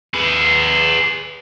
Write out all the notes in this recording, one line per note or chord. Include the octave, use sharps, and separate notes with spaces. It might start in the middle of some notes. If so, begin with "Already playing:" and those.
G#4 B4